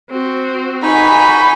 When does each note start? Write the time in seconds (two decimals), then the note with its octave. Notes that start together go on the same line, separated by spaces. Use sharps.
0.10 C4 F#4
0.84 D#4 F#4 G#5 B5